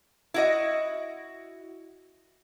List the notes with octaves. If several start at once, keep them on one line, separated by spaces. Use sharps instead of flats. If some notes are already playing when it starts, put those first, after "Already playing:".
E4 F#4 D#5